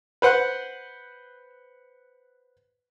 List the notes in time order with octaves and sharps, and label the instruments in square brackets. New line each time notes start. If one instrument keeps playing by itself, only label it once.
[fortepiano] B4 C5 F#5